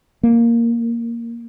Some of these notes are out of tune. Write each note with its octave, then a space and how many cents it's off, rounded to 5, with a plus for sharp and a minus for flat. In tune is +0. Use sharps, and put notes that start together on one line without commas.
A#3 +0